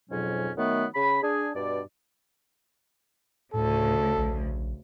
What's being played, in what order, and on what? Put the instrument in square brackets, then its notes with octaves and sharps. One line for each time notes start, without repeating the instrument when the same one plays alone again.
[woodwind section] F2 G#2 B2 F#3 C#4
D#3 F#3 A3 B3
C#3 B5
D4 G#4
G2 B2 D5
[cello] D2 C#3 [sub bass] A2 [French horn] A4
[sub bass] A#1